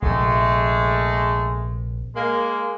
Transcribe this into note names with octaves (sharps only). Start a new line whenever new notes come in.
A#1 C3 G#3 A3
G#3 A#3